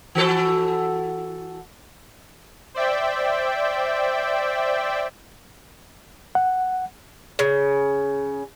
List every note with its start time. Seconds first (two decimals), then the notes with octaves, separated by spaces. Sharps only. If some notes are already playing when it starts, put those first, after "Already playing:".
0.15 E3 F#4 A4
2.74 C5 D5 E5 G5
6.35 F#5
7.39 C#3